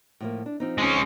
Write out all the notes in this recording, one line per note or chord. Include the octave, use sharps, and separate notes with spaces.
A2 F3 A#3
D4
F3 C4 D#4
G#3 C#4